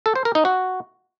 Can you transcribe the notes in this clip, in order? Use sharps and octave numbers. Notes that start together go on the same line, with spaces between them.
A4
C5
A#4
D#4
F#4